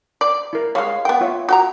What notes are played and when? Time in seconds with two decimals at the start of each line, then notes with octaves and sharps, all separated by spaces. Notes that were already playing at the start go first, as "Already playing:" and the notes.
0.21 D5
0.53 E4 A#4
0.75 G3 G#3 C#5 F5
1.05 B3 G5
1.21 F4 C#5 E5
1.49 F#4 G5 A#5